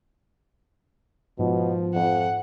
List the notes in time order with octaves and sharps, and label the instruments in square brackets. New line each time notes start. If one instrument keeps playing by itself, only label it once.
[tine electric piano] G#2 [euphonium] B2 [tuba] F3
[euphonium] F2 [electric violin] F#5